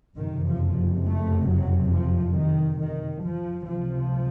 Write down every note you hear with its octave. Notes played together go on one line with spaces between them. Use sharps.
F#1 F2 C3 D#3
F3
A3
F#3
F3
D#3
D#3
F3
C#2 C3 F3